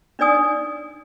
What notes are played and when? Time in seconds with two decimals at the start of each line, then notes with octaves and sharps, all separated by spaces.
0.19 D4 D#4 D5 G#5 D#6